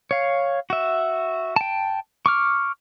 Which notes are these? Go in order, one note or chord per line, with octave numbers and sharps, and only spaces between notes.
C#5 F5
F#4 E5
G5 A5
C#6 D6 F6